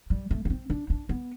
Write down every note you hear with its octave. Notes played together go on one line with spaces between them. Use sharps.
G3
A3
B3
C4
D4
D4
B3